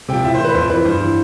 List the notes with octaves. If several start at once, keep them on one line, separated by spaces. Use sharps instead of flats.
C3 F3 G5
A2 E5
C5
E3
B4
F2 C5
E3 B4
G2 C5
E3